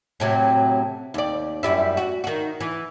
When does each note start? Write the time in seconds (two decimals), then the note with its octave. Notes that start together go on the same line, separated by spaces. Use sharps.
0.20 A2 C3 F#3
1.14 D#2 D5
1.63 F#2 G3 E4
1.97 F#4
2.24 D#3 F#4
2.60 E3